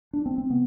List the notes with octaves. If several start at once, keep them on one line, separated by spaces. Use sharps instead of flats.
D4
C4
C4
C3 B3